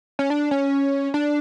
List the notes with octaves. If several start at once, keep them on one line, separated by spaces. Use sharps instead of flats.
C#4
D4
C#4
D4